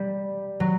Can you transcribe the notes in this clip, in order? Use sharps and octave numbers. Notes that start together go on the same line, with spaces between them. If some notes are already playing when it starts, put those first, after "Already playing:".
Already playing: G3
F#3